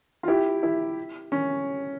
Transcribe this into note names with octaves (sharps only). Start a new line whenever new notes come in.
F4
E4 G4
E4
C#4